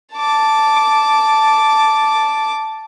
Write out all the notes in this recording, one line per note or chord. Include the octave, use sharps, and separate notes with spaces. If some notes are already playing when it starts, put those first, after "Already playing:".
A5 D6